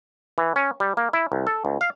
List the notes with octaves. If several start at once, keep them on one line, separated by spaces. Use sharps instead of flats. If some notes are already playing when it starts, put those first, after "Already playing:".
E3
C#4
G3
A#3
E4
C2
A4
C#2
F5